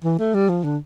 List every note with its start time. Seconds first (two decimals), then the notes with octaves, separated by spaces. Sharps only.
0.04 E3
0.19 A3
0.34 G3
0.49 F3
0.64 D3